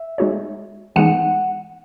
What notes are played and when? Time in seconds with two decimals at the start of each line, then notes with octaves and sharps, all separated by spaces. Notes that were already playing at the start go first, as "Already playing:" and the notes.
Already playing: E5
0.18 G#3 D#4 F#4 C#5
0.96 E3 G#3 B3 D#4 F#5